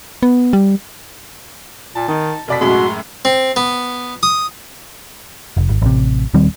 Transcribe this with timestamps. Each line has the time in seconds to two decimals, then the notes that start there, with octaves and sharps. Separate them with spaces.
0.23 B3
0.53 G3
1.95 A#2 A5
2.08 D#3 D#4
2.48 F1 B2 D5 B6
2.61 F#2 A2 G#3 F#4 C6
3.25 C4
3.56 B3
4.23 D#6
5.57 F1
5.70 G#1
5.82 A1 C3
6.34 D#1 D#3 G3 C4